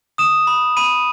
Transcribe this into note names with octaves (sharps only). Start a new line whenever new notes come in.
D#6 E7
B5
B5 D#7